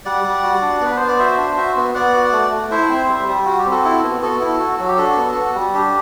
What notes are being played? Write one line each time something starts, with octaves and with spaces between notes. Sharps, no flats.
G3 D5 F#5
G3
F#4
D4
B3 B4
B3 C5
D5
F#4 C5 E5
D4
F#4
B3
B3 D5 F#5
F#4
A3
A3
E4 C5 E5
C4
G3
G3
F#4
G4
C4
F#4 A4
E4
B3
B3 F#4 A4
E4
F#4
F#3 F#4
G4
D4 F#4 A4
B3
F#4
G3
D4 G4